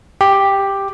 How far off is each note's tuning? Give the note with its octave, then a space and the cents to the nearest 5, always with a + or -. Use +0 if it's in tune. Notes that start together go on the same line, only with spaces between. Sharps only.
G4 +5